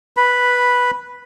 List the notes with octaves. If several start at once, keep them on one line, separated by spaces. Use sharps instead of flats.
B4 B5